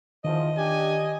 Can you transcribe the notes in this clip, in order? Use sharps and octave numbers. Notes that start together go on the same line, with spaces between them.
E2 D#3 F3 D#5
D4 G4 G#5